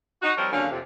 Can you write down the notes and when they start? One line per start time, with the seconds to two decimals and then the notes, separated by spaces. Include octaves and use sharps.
0.22 D#4 F#4
0.37 F3 G3 C4 A#4 C5 C#5
0.52 D#2 D3 F#3 C#4 F5
0.71 F2 C3